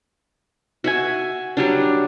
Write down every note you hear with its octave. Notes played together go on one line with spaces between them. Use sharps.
F#4 E5 G#5
F#3 G3 D4